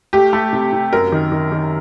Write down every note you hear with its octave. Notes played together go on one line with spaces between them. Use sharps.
A3 G4
A3
C3
C3
F#2 A#4
D#3
D#3
D#3